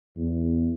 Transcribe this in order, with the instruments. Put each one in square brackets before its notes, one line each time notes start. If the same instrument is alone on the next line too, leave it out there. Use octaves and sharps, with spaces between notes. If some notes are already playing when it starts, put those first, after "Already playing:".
[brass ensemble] E2